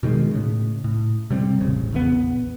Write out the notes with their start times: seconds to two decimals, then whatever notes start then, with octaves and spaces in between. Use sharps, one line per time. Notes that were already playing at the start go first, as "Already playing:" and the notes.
0.03 B2 D#3 G3 G#3
0.31 A2 C#3
0.84 A2
1.30 C3 G3 B3 C4
1.60 E1 A1 C#3
1.93 A#1 E2 C#3 B3